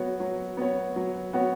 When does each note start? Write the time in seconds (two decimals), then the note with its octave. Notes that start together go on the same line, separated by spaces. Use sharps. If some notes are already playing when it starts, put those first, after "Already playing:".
Already playing: F#3 B3 F#4 C#5
0.20 F#3
0.57 B3 F#4 C#5
0.96 F#3
1.33 B3 F#4 C#5